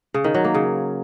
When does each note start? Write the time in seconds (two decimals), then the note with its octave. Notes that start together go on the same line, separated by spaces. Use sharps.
0.14 C#3
0.24 D#3
0.34 F#3
0.44 A#3
0.54 C#3